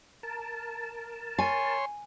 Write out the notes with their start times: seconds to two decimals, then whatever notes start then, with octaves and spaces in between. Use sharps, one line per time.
0.23 A#4 A5
1.39 C#5 G#5 C6